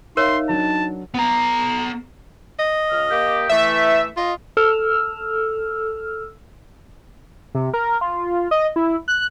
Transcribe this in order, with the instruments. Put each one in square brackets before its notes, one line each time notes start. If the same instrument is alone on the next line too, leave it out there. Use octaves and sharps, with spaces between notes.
[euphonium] D#4 [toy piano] A#4 C#5 [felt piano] E5 F5 [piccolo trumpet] C6
[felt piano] F#3 D4 [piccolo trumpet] A5
[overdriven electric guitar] B3 A#5
[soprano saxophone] D#5
[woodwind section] C#2 F6
A#3 G4
[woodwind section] E3 A3 [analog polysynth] E5
[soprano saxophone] F4 [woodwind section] D#5
[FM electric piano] A4 E6 F6
[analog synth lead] C3
A#4
F4
D#5
E4
F#6